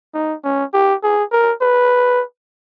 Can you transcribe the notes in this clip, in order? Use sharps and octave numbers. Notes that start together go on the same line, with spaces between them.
D#4
C#4
G4
G#4
A#4
B4